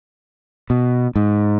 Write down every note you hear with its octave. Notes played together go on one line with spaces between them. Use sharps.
B2
G#2